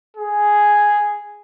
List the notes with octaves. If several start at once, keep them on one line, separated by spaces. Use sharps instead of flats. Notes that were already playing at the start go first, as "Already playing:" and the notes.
G#4